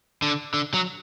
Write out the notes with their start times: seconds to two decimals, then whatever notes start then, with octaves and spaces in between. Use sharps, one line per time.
0.22 D3
0.54 D3
0.74 F#3